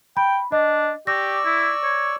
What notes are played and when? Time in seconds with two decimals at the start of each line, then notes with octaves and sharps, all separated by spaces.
0.17 G5 B5
0.52 D4 D#5
1.07 G4 D5 C#6 E6 A#6
1.45 E4
1.83 C#5